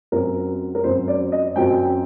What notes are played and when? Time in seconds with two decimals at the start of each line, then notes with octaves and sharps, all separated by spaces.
0.12 F#2 F#3 C4 A#4
0.75 A#4
0.84 F#2 F#3 C4 C5
1.08 D5
1.32 D#5
1.56 F#2 F#3 C4 G5